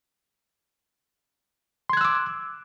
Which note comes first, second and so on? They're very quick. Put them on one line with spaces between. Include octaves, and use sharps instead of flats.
C6 G#6 F#6 E6 D6